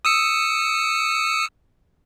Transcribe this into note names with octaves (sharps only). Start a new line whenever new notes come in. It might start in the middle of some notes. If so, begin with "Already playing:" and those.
D#6 E6 C#7